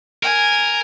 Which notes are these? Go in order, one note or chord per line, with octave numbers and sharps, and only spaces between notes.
A#4 G#5